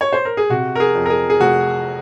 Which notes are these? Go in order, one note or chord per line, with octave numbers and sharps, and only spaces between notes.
C#5
C5
A#4
G#4
C3 F#4
A#4
G#4
F2
A#4
G#4
G#4
F1 F#4